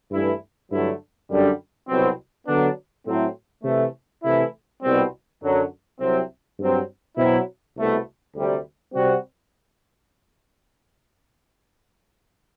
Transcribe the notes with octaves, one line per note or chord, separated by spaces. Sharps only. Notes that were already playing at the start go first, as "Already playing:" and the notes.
G2 E3 A3 E4
G2 D3 F#3 A3 E4
F#2 D3 G3 D4
C2 B2 F#3 C4
D3 F#3 B3 D4
A2 F#3 A3 C4 E4
C3 E3 A3
C3 E3 A3 E4
C2 B2 G3 C4
F#2 D3 F#3
C2 C3 F#3 C4
G2 F#3 C4
B2 F#3 C4 E4
C2 B2 A3
D2 C3 G3
C3 G3 C4 F#4